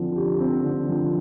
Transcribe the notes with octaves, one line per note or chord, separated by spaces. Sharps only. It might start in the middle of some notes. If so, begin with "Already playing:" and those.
Already playing: D3 F3 C4
G4
C4
D3
F3